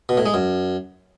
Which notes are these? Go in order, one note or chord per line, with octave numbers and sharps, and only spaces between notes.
B2
A2
G#3
F#2